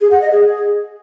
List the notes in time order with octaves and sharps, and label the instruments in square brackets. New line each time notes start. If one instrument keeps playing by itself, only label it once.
[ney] G#4
F#5
D#5
G#4